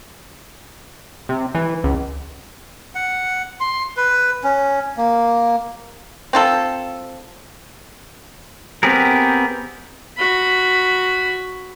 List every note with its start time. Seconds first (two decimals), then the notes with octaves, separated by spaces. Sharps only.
1.29 C3
1.55 E3
1.84 C#2
2.95 F#5
3.60 C6
3.97 B4
4.44 C#4
4.97 A#3
6.33 C4 F4 A4
8.83 B3 C4 G4 G#4 A#4
10.18 F#4 B5